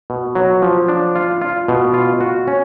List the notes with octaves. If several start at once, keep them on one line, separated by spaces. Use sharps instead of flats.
B2
F#3
F3
D4
F4
F4
B2
F4
F#4
C#4